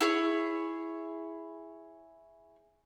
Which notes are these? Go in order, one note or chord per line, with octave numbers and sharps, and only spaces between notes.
E4 G#4 C#5